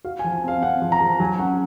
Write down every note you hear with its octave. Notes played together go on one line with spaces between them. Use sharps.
F#4 F5
G#5
F3
C4 F5
C4 F#5
F3
A#5
F3
F#3 G#5
C#4 F#5